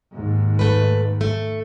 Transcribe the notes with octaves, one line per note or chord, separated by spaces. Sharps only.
D#2 G#2
A3 B4
A3